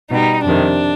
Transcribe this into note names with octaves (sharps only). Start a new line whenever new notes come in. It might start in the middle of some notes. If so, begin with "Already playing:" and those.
B2 G3 D#4
F2 C3 D#3 D4